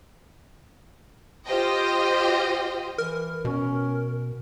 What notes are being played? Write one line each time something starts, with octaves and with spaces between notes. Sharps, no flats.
F4 G4 C5 D#5 G5
E3 A#4
B2 C#4